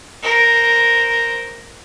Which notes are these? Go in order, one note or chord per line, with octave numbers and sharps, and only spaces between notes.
A#4 C5